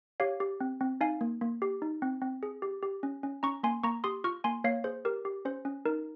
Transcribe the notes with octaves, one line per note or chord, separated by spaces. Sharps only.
G4 C#5 F5
G4
C4
C4
D#4 F5 G#5
A#3
A#3
G4
D#4
C4
C4
G#4
G4
G4
C#4
C#4
C#4 A#5 C#6
A#3 G#5 C6
A#3 A#5 C#6
G4 C6 D#6
F4 C#6 F6
A#3 G#5 C6
A#3 C#5 F5
G#4 C5
G4 A#4
G4
C#4 C5
C#4
D#4 A#4